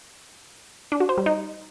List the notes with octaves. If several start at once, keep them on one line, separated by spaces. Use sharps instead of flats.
D4
F#4
C5
G3
D#4